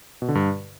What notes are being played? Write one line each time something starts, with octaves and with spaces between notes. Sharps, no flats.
B2
D3
G2